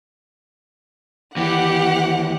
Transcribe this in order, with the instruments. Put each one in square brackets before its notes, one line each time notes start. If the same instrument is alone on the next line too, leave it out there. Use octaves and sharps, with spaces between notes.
[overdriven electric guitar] D#2 E3 [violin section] G4 F#5